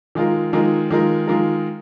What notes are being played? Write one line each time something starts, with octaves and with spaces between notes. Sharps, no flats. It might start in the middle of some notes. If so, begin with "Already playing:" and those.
D#3 G#3 F4 A#4
D#3 G#3 F4 A#4
D#3 G#3 F4 A#4
D#3 G#3 F4 A#4